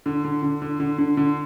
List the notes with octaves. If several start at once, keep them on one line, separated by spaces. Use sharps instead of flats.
D3
D3
D3
D3
D3
D3
D3